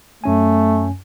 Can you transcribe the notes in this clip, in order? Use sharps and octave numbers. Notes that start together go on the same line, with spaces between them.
F#2 A3 C#4 G#5